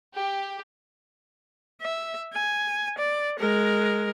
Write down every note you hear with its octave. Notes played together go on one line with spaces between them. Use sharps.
G4
E5
G#5
D5
G#3 A#4